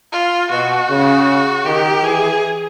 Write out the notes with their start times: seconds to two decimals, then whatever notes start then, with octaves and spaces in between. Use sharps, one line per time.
0.13 F4
0.51 B2 F#4
0.89 C#3
1.66 D#3 G4
2.03 E3 G#4